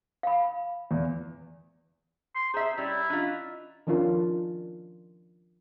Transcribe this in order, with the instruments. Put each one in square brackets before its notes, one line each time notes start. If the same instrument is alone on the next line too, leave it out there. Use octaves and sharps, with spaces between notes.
[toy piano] F5 B5
[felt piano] E2
[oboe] C6
[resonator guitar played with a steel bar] G#4 E5 [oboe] C5 [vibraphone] A#5
[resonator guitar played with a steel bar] G3 C#4 [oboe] E4
[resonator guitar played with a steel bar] E3 F4 [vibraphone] C#4 D4 D#5
[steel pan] D#3 F3 C#4 D4 F4 A#4